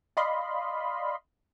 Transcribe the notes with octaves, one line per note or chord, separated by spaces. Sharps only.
D5 D#5 F5 B5 C6